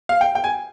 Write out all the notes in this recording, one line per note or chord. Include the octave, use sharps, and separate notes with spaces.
F5
G5
G5
G#5